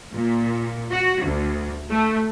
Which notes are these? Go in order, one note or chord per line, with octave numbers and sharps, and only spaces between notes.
A#2
F#4
D2
A3